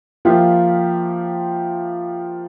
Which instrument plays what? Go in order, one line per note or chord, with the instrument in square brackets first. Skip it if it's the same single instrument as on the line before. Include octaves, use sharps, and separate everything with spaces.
[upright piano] F3 A#3 F4 G4 E5